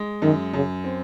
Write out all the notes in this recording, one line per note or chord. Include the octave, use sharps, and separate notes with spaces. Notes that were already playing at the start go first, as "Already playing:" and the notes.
Already playing: G#3
F#2 D#3
F#2 C#3
C4